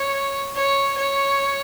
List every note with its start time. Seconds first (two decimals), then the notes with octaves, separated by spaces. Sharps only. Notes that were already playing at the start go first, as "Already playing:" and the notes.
Already playing: C#5
0.55 C#5
0.97 C#5